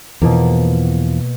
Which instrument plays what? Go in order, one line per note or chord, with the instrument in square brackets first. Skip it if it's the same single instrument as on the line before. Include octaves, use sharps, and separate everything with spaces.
[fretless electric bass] E2 E3 F3 [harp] B2 A#3